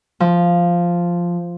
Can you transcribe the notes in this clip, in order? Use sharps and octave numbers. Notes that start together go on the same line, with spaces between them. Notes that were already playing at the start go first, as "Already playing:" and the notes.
F3